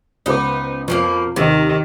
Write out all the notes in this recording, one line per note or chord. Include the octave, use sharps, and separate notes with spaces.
C#2 B3 D#4 C5 D6
F2 B2 F3 A#3 D7
D#2 C3 D#3